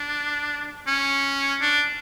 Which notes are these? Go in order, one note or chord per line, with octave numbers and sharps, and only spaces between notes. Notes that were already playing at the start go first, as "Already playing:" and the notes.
Already playing: D4
C#4
D4